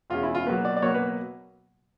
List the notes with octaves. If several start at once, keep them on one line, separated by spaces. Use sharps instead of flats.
E2 B2 G#3 C#4 F4
E4
F4
B2 F#3 A#3 B4
D5
D5
B2 F#3 A#3 C#5
B4